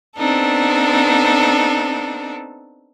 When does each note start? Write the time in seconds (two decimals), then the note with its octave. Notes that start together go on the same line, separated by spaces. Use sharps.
0.17 B3 C4 D4 D#4 A4